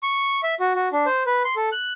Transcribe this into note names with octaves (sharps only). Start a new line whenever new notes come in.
C#6
E5
F#4
F#4
D4
C5
B4
C6
A4
F#6